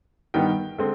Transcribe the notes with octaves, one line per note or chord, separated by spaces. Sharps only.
G2 D#3 G3 B3 G5
D3 G#3 C4